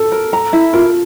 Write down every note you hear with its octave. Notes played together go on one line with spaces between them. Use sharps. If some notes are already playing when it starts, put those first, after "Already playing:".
Already playing: A4
A#4
A#5
E4
F4 A#4